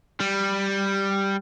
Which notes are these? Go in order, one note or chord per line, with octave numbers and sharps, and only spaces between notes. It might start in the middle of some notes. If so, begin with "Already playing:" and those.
G3